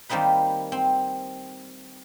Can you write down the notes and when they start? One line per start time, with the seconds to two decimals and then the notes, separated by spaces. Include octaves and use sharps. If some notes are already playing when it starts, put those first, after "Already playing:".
0.09 D#3 G3 A#3 C4 D#4 B4
0.72 C4